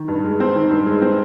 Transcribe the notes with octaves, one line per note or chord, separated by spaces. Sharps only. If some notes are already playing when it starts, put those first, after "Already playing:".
Already playing: D#3
G2
G#3
C4
D#3
G2
G#3
C4